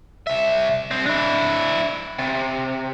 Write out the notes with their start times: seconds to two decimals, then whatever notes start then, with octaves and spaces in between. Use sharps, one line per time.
0.27 C2 E5
0.91 C2 C4
1.06 D4 E4
2.18 C3